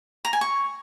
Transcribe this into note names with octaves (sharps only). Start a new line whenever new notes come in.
A#5
G#5
C#6